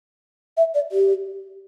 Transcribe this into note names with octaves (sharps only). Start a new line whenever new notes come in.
E5
D5
G4